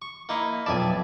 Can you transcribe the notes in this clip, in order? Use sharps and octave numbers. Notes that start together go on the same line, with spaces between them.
C#6
A#3 D#4 E4
B1 F2 D5 E5 G#5 A5